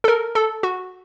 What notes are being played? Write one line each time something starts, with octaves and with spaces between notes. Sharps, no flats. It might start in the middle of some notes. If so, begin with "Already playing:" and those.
A4
A#4
A4
F#4